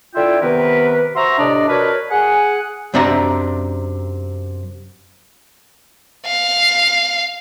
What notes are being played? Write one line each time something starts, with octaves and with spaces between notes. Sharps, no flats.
D3 E4 F4 E5 G5
C3 D#3 B3 A#4 B4
F#4 C5 E5 A#5 C6 C#6
A2 C3 D4 D5 D#5
D4 F#4 A#4 B4 C#5
G#4 F#5 G#5
F#2 C3 C4 D4 E5 A#5
F5